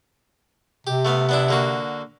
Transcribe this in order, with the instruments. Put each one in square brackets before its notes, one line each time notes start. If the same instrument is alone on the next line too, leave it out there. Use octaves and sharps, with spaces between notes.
[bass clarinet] C3 [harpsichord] G4
[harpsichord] A3 B3 F5
B3 D4 E4
D3 A#3 F#4